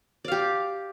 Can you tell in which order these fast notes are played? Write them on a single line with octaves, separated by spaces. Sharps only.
D5 F5 G4